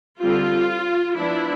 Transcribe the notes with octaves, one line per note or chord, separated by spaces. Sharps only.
D3 G3 C4 F4
F3 B3 D4 E4